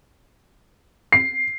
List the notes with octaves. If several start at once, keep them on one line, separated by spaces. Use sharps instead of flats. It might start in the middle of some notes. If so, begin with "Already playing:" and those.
C7